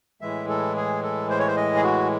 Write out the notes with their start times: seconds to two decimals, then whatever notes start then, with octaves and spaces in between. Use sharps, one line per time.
0.21 A2 E3 G#3 E5
0.49 A4
0.76 G#4
1.03 A4
1.30 C5
1.39 C#5
1.47 C5
1.57 D#5
1.76 G#4
1.83 F#4